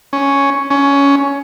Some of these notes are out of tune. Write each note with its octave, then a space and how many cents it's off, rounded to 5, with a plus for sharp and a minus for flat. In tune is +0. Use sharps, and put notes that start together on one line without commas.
C#4 +5
C#4 +15